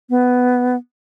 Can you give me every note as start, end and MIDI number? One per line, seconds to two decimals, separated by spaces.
0.10 0.76 59